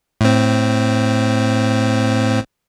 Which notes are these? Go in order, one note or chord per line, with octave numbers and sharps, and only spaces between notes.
A2 C4